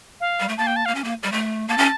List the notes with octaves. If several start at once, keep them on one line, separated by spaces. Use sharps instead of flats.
F5
G3
A3
A#3 A5
G5
A5
A#3 F5
C#4
A#3
G3
A3
A#3 A5
C#4